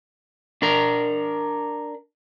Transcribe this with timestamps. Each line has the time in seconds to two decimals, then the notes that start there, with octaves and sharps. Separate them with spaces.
0.62 D4 A#4